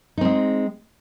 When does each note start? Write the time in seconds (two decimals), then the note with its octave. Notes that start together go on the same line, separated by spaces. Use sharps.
0.17 D#4
0.21 C4
0.25 G#3